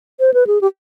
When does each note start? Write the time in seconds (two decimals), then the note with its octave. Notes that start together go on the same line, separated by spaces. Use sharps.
0.20 C5
0.34 B4
0.47 G#4
0.61 G4